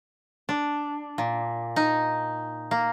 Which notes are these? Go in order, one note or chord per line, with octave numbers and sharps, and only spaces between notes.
D4
A#2
D#4
A#3